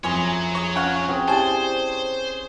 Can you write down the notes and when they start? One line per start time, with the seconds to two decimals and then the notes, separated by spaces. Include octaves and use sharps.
0.04 F2 E3 C#4 G#4 C#5 A#5 C6
0.55 G#4 C#6
0.76 C#4 F4 F#5 G5 C#6
1.08 C4 G#4 C#5
1.28 E4 G4 C5 D5 G#5 A5